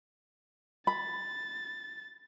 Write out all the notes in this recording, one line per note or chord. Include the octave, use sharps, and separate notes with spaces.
B5 A6